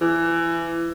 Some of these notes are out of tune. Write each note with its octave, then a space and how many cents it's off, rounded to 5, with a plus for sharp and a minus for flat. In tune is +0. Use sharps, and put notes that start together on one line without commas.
E3 +25